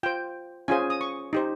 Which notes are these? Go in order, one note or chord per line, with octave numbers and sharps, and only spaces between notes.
F4 C5 G5
C#4 F4 G#4 C5 G#5
D#6
C#6
D#4 G4 C5